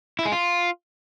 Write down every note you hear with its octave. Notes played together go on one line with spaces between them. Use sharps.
E4
G#3
F4